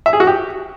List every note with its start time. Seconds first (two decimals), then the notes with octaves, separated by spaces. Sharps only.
0.06 E5
0.13 G#4
0.20 F#4
0.27 G4